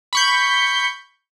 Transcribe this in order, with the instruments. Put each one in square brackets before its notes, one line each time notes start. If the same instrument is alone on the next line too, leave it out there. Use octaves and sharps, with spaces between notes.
[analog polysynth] B5 C#6 G6